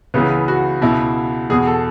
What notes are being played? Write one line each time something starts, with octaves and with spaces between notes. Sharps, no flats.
C#2 C#3 E3 B3
F#4
C#2 B2 E4
E2 B2 G#4
A4